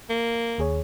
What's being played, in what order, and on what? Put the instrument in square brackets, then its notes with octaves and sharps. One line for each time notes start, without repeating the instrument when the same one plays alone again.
[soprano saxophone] A#3
[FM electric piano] D#2 G#4 C#5